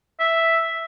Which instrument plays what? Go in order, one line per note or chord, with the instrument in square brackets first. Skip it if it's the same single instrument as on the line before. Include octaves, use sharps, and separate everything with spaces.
[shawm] E5